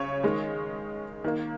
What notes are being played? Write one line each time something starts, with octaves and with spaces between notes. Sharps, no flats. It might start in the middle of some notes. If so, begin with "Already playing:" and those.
Already playing: C#3 C#5
D#3 G#3
D#3 A#3